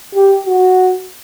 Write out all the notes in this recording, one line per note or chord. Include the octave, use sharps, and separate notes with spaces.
G4
F#4